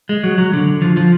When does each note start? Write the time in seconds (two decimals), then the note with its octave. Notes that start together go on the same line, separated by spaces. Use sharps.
0.09 G#3
0.24 F#3
0.38 F#3
0.53 D3
0.82 F3
0.97 F3